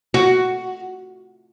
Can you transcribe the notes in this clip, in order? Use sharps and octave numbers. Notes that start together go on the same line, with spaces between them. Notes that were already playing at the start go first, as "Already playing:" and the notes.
F#4